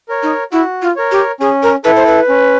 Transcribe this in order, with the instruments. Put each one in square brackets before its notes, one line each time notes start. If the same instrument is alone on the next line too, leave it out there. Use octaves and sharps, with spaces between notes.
[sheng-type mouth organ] A#4 C#5
[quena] D#4
[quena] E4 [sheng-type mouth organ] F#4
[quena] F4
[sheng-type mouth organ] A#4 C#5
[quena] G4
[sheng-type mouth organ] C#4 [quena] G#4
[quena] A#4
[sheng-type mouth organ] E4 A4 [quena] B4
[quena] C5
B4
[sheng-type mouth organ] C#4